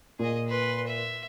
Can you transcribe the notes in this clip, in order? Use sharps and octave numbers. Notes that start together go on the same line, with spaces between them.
A#2 G#4 D#5
B4 C6
E5